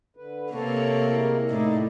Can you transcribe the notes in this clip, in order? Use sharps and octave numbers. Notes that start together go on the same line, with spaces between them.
D3 B4
C3 A#3 A4 C#5
G#3 E4 A#4
A2 D#4 E4 D5